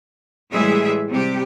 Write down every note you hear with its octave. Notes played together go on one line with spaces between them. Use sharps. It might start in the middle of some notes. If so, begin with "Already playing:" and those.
A2 E3 G3 G#3 G#4 E5
C3 G3 G4